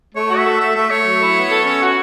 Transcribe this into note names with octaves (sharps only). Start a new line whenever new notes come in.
A3 C#5
F#4
E5
A4
A3 E5
A3 E5
A3 C#5
F#3
E4
B3
A4
C#4
F#4